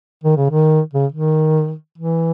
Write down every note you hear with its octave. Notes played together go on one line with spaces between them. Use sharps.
D#3
C#3
D#3
C#3
D#3
E3